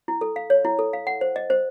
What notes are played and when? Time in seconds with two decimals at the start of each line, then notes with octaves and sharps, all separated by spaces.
0.08 E4
0.21 A4
0.36 F5
0.50 C#5
0.65 E4
0.79 A4
0.93 F5
1.07 F#5
1.21 C5
1.36 D#5
1.50 C5